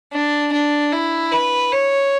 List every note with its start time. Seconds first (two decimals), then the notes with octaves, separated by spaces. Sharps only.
0.12 D4
0.53 D4
0.93 E4
1.32 B4
1.73 C#5